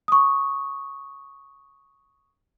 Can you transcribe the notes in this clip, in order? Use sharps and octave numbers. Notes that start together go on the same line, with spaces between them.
C#6 D#6